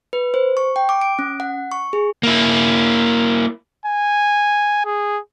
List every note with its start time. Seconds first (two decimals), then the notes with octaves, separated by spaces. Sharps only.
0.13 B4
0.34 C5
0.57 C#6
0.76 G5
0.89 D6
1.02 D7
1.19 C#4
1.40 F#5
1.72 C#6
1.93 G#4
2.23 A#3 E4
3.86 G#5
4.85 G#4